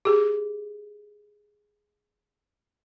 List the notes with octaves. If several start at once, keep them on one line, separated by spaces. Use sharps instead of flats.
G4 G#4